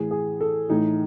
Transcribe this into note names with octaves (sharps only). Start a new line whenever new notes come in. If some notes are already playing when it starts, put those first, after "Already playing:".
Already playing: A2 E3 G#4
G#4
A4
A2 E3 D#4